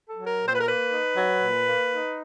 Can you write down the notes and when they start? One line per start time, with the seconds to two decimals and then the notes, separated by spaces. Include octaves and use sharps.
0.09 A4
0.15 F#3
0.27 A#4
0.41 A#2
0.46 C5
0.53 B4
0.61 A#4
0.65 A#3 B4
0.90 D#4
1.15 F#3
1.40 A#2
1.66 A#3
1.90 D#4